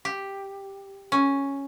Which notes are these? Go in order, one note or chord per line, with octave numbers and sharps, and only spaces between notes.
G4
C#4